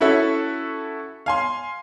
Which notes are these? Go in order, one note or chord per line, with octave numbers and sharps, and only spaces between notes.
C#4 E4 F#4 A4 E5
F5 G#5 C6